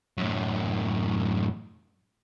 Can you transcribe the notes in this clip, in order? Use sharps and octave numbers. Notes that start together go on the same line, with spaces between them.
F#2 A2